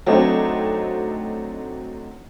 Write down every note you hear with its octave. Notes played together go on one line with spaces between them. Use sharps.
F#3 A3 C4 D4 D#4